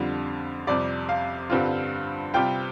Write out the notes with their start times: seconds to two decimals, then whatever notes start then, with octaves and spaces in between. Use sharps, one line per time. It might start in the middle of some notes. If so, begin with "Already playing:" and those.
Already playing: F2 D3 G3 F4
0.67 F2 C3 G3 D5
1.09 F5
1.50 G2 D3 G3 C4 F4
2.34 C3 G3 C4 F4 G5